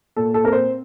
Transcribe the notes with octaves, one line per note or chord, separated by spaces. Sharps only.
A#2 A4
A4
C4 A#4
C5